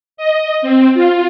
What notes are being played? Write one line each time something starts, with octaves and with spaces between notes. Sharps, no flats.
D#5
C4
F4